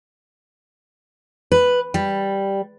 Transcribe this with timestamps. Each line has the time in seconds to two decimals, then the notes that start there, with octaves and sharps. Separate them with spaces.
1.52 B4
1.94 G3